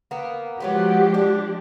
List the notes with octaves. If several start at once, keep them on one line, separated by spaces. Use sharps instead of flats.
A#3 B3
F3 F#3 G#3 B3 F#4 G4
D4